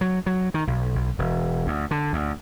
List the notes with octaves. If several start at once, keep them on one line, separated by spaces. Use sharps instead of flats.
F#3
F#3
D#3
B1
B1
E1
D2
D3
D2